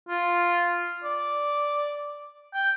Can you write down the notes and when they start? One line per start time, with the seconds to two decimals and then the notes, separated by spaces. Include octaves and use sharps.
0.09 F4
1.04 D5
2.54 G5